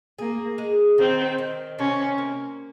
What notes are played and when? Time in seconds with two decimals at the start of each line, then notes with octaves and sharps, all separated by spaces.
0.18 A#3 G#4
0.58 G#3
0.98 D#3 C4
1.38 D#3
1.78 C3 C#4
2.18 A#3